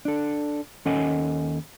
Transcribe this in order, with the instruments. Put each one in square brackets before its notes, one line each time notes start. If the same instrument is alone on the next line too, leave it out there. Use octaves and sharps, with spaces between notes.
[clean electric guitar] D4 A4
D#2 C#4 A4 D#5 F#5 G#5